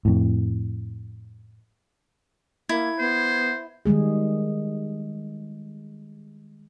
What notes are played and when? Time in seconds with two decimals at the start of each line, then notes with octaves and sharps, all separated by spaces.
0.05 F2 A2
2.69 A#3 E4 G#6
2.99 B3 C5
3.86 D#3 G3 G#3 G#4